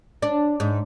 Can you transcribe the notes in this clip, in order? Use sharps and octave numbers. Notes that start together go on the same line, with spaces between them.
D4
G#2